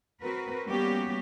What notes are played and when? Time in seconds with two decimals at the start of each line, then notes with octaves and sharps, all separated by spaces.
0.22 C4 F#4 A#4 B4
0.66 G3 A#3 B3 C#4 F#4 G4